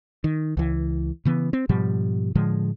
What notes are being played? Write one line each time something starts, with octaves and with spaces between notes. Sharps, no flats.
D#3
C#2 E3
C#3 E3 B3
C4
G#2 B2 F3 G3
A2 D3 F3 G#3